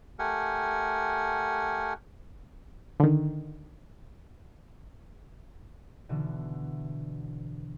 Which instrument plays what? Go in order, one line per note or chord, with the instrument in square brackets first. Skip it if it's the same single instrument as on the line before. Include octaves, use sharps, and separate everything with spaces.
[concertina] A3 G4 A#4 F#5 G#5
[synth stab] D3 D#3
[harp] B2 D3 E3